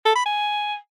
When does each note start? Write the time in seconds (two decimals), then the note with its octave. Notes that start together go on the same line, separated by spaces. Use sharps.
0.05 A4
0.15 B5
0.26 G#5